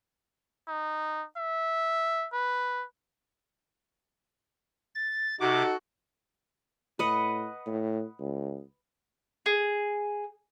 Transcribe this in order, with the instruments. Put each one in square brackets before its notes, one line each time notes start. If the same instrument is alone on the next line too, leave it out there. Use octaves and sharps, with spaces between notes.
[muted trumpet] D#4
E5
B4
[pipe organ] A6
[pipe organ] C3 D6 [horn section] D#4 F#4 A4
[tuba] A2 [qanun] B4 D#5 F#5
[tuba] A2
C#2
[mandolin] G#4